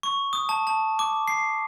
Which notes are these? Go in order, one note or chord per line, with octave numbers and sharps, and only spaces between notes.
C#6
D#6
A5
A5
D6
C7